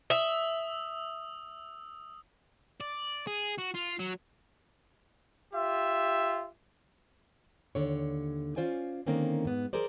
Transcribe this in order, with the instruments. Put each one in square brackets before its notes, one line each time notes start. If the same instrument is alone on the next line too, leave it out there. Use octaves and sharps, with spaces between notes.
[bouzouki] E5 [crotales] D#6 E6
[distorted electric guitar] D5
G#4
F#4
F4
F#3
[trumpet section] F4 G4 E5
[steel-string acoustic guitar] D#2 D3 C#5
C#4 D4 F4 C5 D5 G#5
D3 D#3 A#3 C4 C#4
G#2 B3
G#4 A#4 C5 D5